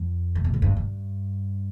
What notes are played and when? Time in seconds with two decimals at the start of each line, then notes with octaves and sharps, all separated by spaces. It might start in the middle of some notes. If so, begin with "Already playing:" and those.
Already playing: F2
0.35 C3
0.44 B2
0.54 A2
0.62 G2
0.77 G2